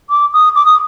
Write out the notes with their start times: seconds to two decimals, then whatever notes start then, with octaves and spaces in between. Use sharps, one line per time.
0.10 D6
0.33 D#6
0.56 D6
0.66 D#6